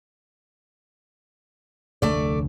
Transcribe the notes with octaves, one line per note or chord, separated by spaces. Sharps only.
F1 D2 A3 D4 D5